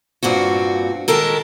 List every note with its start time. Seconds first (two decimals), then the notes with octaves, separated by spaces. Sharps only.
0.23 G2 A#2 C4 F#4
1.08 D#3 G#3 G4 A4 A#4